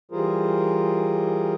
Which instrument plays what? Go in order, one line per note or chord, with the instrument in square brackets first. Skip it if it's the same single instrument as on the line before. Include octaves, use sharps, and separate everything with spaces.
[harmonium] E3 G3 F4 G#4 A#4 C5